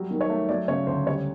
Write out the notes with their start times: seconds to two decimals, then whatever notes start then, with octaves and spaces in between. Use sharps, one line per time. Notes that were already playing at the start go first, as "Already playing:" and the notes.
Already playing: F#3 G3
0.11 D#3
0.21 C#5
0.30 A3
0.49 F#3 D5
0.68 C#3 C#5
0.87 D2 C5
1.06 G3 C#5